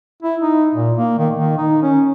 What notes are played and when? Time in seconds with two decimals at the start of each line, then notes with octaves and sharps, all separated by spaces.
0.23 E4
0.42 D#4
0.75 A#2
0.97 A#3
1.18 D#3
1.36 D#3
1.57 D#4
1.82 C#4